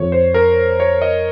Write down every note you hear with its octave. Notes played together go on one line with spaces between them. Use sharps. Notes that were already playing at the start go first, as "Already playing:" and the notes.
Already playing: F2 C#5
C5
A#4
C#5
D#5